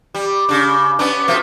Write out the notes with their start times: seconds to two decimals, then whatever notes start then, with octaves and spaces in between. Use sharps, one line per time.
0.15 G3
0.49 C#3 D4
0.99 B3 C#4 D4
1.28 B2 F3 A3